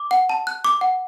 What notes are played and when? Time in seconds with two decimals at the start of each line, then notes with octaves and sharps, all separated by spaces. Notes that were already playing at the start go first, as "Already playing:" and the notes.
Already playing: D6
0.11 F#5
0.29 A5
0.47 F#6
0.65 D6
0.81 F#5